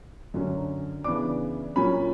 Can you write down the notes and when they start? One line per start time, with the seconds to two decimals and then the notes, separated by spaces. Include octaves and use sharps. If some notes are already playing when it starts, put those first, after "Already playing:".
0.34 F#2 D3 F#3 C#4
1.04 C#3 E3 B3 D4 D6
1.76 A#2 F#3 C#4 B5